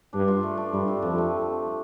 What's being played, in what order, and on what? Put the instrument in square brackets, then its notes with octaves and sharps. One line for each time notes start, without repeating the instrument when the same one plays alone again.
[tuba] G2 [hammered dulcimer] D4
[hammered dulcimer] F4
A3
D4
[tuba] G2 [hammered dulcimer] G3
[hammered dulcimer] C4
[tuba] F2 [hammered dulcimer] F3
[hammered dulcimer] A3